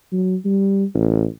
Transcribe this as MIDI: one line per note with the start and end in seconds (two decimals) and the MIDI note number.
0.12 0.36 54
0.45 0.85 55
0.94 1.25 33